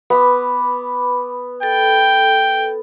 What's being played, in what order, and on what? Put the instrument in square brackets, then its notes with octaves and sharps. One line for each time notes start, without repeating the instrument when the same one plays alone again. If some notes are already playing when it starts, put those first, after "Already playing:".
[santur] B3 [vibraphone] B4 B5 D6
[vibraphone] A4 [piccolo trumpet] G5